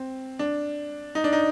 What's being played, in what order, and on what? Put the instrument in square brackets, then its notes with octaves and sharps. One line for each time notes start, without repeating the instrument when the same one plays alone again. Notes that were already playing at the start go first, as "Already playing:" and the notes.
Already playing: [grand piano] C4
D4
D#4
D4
D#4